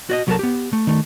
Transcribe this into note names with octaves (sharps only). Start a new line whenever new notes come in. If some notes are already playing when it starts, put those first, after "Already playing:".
F#4 D5 D#5
C2 F#3 G4 A4 A#4 A5
B3 G4
A3
D#3 A3